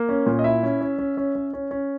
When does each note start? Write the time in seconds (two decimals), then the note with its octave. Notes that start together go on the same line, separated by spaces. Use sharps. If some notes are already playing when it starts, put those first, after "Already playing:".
Already playing: A#3
0.09 C#4
0.26 A#2
0.39 D#5
0.44 E4 E5
0.63 C#4
0.81 C#4
0.98 C#4
1.17 C#4
1.35 C#4
1.53 C#4
1.71 C#4